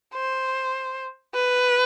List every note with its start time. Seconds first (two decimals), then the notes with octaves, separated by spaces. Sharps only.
0.15 C5
1.34 B4